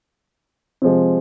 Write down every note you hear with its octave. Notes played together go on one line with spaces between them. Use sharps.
C3 F3 G#3